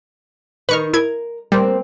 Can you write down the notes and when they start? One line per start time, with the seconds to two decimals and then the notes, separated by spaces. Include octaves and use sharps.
0.69 D#3 D#4 B4 C#6 F6
0.93 E4 A#4 G#6
1.52 G3 A#3 C4